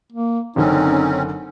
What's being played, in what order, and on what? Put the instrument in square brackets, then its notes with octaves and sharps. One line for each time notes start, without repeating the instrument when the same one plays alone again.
[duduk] A#3
[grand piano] F#1 D3 [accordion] C4 C#4 [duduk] D#4